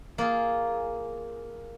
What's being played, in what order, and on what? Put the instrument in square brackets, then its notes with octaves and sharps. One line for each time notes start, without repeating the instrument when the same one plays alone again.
[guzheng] A#3 F4 G#4